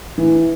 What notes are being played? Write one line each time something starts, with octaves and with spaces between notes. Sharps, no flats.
E3